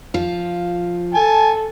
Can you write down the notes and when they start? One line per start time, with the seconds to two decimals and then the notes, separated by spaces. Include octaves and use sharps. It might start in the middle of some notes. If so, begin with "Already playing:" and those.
0.14 F3 F4
1.14 A4 G#5 A5